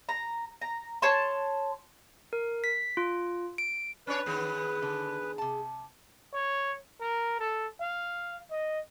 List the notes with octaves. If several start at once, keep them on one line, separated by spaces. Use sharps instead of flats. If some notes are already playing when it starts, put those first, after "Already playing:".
A#5
A#5
C#5 A5 C6
A#4
B6
F4
D7
C#4 D4 B4 C#5
D#3 B3 G#4
D3
C3 A5
C#5
A#4
A4
F5
D#5